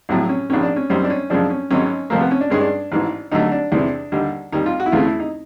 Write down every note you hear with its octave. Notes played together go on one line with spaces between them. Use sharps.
A#1 A2 F#3 E4
C#4
A#1 G#2 D#3 C#4
D4
C#4
G#1 F#2 D#3 G3 C4
D4
C#4
F#2 C#3 F3 G#3 D4
C#4
G#1 G#2 D#3 F#3 C#4
F2 C3 F3 A3 A#3
B3
C#4
D4
G2 D#3 G#3 C#4
D4
A1 G#2 E3
D#2 D3 F#3 A3 D#4
D4
E2 C3 E3 D4
D#2 D3 G3
D#2 D#3 G3 D#4
F4
F#4
E4
E2 C#3 E3 A3 F4
E4
D#4